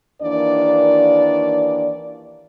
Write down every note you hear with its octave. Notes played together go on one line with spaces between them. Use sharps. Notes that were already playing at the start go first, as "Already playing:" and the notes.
D#2 E3 A#3 D4 D5